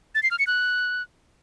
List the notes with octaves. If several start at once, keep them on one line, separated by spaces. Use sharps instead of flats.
A6
C7
F6
C#7
F#6